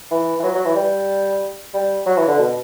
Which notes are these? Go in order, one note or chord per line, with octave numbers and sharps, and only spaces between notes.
E3
E3
F#3
F#3
E3
G3
G3
F#3
E3
D3
B2